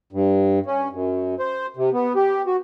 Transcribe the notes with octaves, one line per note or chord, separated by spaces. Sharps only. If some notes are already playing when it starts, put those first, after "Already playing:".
G2
C#4
F#2
C5
C3
B3
G4
F#4